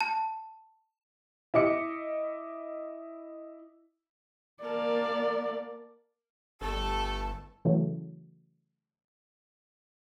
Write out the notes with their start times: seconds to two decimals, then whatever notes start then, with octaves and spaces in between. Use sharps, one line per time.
0.01 A5
1.54 E4 D#5 D6 C#7
4.63 A#3 A#4 D5 A5
6.61 G1 A3 G4 A4 A5
7.65 C#3 E3 F#3 A3